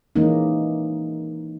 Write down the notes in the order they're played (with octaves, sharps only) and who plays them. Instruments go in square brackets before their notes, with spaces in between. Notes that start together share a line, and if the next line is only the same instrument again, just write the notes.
[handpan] E3 G#3 A#3 C#4 D#4